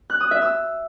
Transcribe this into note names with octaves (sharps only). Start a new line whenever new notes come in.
F#6
D#6
E5
E6